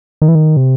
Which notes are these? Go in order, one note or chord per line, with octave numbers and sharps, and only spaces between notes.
D#3
E3
D#3
C3